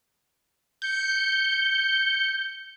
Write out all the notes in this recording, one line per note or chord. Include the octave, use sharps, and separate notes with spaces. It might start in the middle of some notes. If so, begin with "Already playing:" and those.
G6 C#7